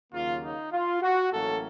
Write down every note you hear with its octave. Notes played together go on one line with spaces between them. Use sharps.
D#2 C#3 F#3 A#3 F4
D#4
F4
F#4
A1 A2 F#3 A#3 C#4 A4